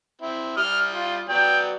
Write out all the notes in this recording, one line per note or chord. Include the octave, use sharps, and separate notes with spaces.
C4 E4
G3 D#6 F6
F4
F#3 B3 D5 G5